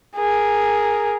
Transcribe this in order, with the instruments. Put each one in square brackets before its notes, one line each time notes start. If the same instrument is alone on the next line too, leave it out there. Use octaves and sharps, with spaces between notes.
[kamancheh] G#4 A#4